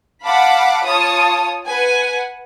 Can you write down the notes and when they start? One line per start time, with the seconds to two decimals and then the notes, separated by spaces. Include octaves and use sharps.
0.23 F5 F#5 A5 B5 D6
0.85 F4 C#5 A5 D#6
1.64 B4 F#5 G#5